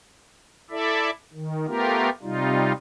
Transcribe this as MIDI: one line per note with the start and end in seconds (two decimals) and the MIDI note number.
0.71 1.10 64
0.71 1.10 69
0.71 1.10 74
0.71 1.10 76
1.33 1.66 51
1.67 2.09 57
1.67 2.09 59
1.67 2.09 65
1.67 2.09 67
1.67 2.09 70
2.23 2.73 48
2.23 2.73 55
2.23 2.73 63
2.23 2.73 65